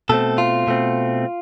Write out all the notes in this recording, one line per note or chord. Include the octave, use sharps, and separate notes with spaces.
B2 A3 C4 A4
F4
B2 A3 C4